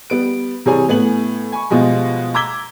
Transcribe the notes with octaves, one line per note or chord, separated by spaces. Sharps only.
G3 B3 D7
C3 E3 G3 G#4 C#5 G#5
A2 B3 G#5 F#7
G#5 B5 C#6
B2 F3 G3 G#3
A#5 D6 E6 G#6 B6 G7